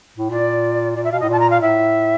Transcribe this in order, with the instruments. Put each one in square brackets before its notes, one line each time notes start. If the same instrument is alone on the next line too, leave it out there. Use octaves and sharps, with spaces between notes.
[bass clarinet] A2
[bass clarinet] A#2 [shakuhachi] D5
[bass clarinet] A#2 [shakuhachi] D5
[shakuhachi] E5
[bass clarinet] B2 [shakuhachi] F5
[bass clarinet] A2 [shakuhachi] D#5
[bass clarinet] A#2 [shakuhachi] A5
[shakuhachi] A#5
F5
[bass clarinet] A2 [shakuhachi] E5